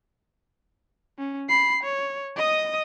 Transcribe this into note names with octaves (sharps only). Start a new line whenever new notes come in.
C#4
B5 C7
C#5
D#5 D#6